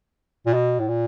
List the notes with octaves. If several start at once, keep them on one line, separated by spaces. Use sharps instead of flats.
A#2
B2
A2
A#2